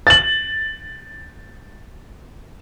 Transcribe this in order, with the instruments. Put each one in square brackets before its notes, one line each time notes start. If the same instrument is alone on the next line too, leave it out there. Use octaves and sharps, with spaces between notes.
[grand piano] A6 F#7